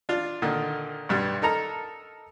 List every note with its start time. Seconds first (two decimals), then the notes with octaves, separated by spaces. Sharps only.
0.09 D4 F4
0.42 A#2 D3 D#3
1.09 B1 G2 G3
1.42 D#4 A4 A#4 A#5